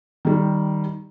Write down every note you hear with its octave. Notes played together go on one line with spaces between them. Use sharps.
D#3 G3